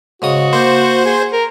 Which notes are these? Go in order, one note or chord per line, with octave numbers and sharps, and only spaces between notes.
G#2 C#3 F#4 D#6
A#3 C5
G#4
A#4